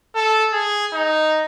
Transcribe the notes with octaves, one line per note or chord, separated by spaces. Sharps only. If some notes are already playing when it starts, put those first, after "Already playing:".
A4
G#4
D#4